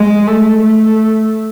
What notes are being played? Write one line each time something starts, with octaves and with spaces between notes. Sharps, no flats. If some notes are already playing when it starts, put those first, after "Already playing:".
Already playing: G#3
A3
A3